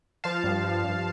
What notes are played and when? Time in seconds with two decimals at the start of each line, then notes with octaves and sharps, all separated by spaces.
0.24 F3 F5 A5
0.44 G2
0.64 F3
0.84 G2